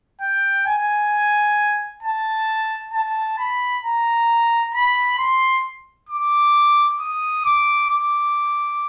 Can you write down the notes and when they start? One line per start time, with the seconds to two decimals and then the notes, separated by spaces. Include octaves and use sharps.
0.21 G5
0.67 G#5
2.03 A5
2.93 A5
3.39 B5
3.84 A#5
4.74 B5
5.18 C6
6.09 D6
7.00 D#6
7.45 D6
7.90 D6